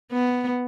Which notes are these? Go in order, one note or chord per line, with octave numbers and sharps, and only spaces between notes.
B3